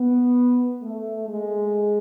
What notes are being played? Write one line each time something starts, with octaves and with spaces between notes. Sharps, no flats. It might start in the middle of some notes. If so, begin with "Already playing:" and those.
Already playing: B3
A3
G#3